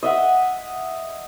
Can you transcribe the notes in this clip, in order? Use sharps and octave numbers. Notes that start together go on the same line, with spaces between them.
D#5 E5 F#5